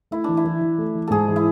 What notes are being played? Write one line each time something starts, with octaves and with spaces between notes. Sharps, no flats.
A3 E4
E3 D4
E4
E3
E3
A3
E3
G#2 G#4 A4
E3
E4